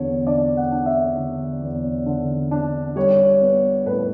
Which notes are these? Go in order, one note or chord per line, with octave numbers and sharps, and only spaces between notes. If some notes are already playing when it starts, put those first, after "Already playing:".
Already playing: E2 D3 C#5
D4 D5
F#5
D4
E5
D3
E2
D3
D4
G3 C#5
B3
A2 B4